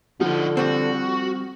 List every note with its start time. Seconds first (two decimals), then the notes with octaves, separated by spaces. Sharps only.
0.20 D3 F3 D#4 A4 F#5
0.57 G3 C4 F#4